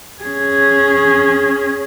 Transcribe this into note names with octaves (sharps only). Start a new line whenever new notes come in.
C#4 G#4